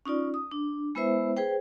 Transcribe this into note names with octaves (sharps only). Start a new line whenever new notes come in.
C#4 D#4 F4 D5
D#6
D4
G#3 B3 E4 B4 C5 E5
G#4 B4 C5 G5